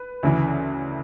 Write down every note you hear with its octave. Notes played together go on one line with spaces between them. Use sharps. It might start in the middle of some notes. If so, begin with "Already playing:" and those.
Already playing: B4
D2 C#3 E3